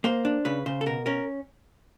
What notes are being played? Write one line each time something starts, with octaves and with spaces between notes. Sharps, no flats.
A#3 C5
D4
C#3 B4
C#3 C5
A4
B2 A#4
C#4 A#4